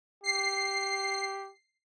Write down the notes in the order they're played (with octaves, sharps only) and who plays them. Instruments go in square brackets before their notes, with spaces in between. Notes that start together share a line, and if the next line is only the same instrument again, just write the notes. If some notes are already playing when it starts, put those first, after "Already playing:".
[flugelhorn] G4 [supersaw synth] C7